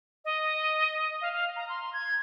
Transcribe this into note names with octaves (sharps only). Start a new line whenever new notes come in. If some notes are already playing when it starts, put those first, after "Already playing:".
D#5
F5
F5
A#5
C6
G#6